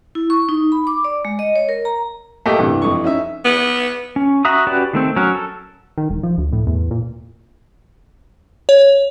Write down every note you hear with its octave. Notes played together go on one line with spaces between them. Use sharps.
E4
C#6
D#4
B5
D6
D5
G#3
D#5
C#5
A#4
A#5
A3 A#3 G4 D#5
C2 G2 E3
F2 C#6
C#4 D#4 E5
B3
C#4
F#4 E5 A#5 D#6
C#4 F#4 G4 B4 D5
D#3 A3 C4
F#3 C#4 A#4
A4
D#3
E1
F3
D2
A2
E2
A#2
C#5